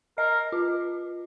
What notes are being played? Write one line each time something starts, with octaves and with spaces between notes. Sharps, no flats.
A#4 D#5
F4